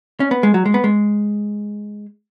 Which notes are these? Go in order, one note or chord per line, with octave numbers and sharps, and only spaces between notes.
C#4
B3
G#3
F#3
G#3
B3
G#3